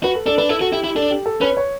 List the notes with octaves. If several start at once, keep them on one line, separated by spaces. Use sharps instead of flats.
F#4 B4
A4
D4 A4
D4 B4
E4 A4
F#4 A4
E4 G4
E4 G4
D4 A4
G4
A4
C#4 B4
C#5